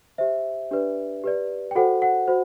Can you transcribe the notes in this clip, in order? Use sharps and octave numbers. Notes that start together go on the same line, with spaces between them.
G4 C5 E5
D4 G4 B4 D5
G4 B4 D5
G5
F#4 A4 C5 F#5
F#5
F#4 C5